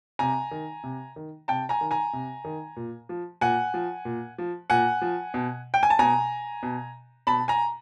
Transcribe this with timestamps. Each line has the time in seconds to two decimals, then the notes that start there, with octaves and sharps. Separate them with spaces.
0.19 C3 G#5 A#5
0.51 D#3
0.84 C3
1.16 D#3
1.48 C3 G5 A5
1.69 G#5 A#5
1.81 D#3
1.91 G#5 A#5
2.13 C3
2.45 D#3
2.76 A#2
3.09 F3
3.41 A#2 F#5 G#5
3.74 F3
4.05 A#2
4.38 F3
4.70 A#2 F#5 G#5
5.02 F3
5.34 B2
5.74 G5
5.83 G#5
5.90 A5
5.99 B2 G#5 A#5
6.63 B2
7.27 B2 A5 B5
7.48 G#5 A#5